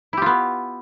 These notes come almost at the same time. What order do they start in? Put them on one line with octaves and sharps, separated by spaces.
E4 G4 F4 B3